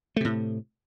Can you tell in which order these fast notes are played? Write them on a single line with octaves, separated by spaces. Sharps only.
A3 C3 A2